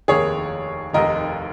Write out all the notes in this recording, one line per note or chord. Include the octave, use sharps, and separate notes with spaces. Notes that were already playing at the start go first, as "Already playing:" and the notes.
F1 D#2 D#3 A#3 G#4 C#5
F1 D#2 D#3 A#4 D#5